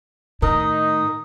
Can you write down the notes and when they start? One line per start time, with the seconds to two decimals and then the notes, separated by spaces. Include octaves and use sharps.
0.42 A2 D#3 D#4 D#6